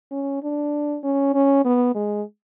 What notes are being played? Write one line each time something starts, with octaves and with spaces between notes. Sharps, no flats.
C#4
D4
C#4
C#4
B3
G#3